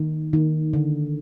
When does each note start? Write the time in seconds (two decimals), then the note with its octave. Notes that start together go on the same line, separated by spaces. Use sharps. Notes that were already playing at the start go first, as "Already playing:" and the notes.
Already playing: D#3
0.33 D#3
0.73 D3